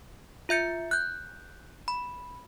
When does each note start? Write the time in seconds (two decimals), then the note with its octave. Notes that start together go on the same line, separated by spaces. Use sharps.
0.49 F4 E5 G6 C#7
0.91 F#6 G6
1.88 B5